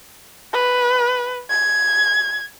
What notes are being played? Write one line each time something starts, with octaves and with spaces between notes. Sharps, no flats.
B4
G#6